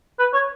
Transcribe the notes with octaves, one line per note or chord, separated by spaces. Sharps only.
B4
C#5